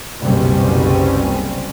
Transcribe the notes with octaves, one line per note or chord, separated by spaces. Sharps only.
F#1 C2 B2 G3 C4 C#4